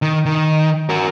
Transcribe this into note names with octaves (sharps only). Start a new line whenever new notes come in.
D#3
D#3
F#4 A#4